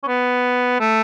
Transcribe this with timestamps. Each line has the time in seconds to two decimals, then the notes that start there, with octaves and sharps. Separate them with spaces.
0.03 C#4
0.07 B3
0.80 A3